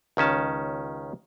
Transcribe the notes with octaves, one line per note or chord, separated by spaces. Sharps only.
C#2 D#3 C#4 A5